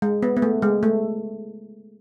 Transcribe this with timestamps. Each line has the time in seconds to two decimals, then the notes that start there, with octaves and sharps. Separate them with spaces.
0.02 G#3
0.23 B3
0.37 B3
0.42 A3
0.62 G#3
0.83 A3